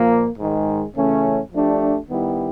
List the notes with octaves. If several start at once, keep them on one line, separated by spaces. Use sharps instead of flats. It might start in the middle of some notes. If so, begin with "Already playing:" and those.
Already playing: A#2 F3 A#3
G#2 D#3 G#3
C#3 E3 A3 C#4
F3 A3 D4 G4
D#3 G3 B3 E4 G4